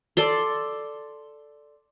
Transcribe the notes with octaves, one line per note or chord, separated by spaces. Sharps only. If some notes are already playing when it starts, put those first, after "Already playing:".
A4 D5 C6